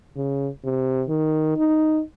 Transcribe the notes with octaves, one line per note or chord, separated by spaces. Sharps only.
C#3
C3
D#3
D#4